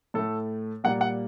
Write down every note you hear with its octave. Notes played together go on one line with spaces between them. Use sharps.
A2 A3 A4
A#2 G3 A#3 F#5
F#5